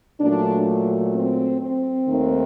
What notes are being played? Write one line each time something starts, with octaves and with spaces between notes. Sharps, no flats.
A#2 F#3 A3 D4
C4
C4
D#2 D#3 A3